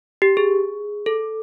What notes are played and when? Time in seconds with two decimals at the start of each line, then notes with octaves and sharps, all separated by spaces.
0.22 G4
0.37 G#4
1.06 A4